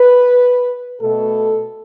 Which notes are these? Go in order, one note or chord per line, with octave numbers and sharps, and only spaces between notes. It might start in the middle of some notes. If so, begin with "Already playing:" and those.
Already playing: B4
B2 A3 A4